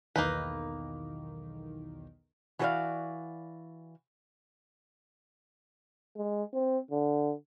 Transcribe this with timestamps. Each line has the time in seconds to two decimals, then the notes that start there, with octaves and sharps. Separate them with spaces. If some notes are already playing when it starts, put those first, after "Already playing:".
0.16 B1 E2 D#3 A#3 D#4 B4
2.59 E3 F#4 A4 B4 D5 F5
6.17 G#3
6.54 C4
6.91 D3